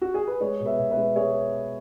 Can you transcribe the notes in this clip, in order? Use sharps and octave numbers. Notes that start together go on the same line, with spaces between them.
F#4
G#4
B4
G#3 G#4 C#5
B2
B4 E5
B2
B4 E5
G#3
G#3 G#4 C#5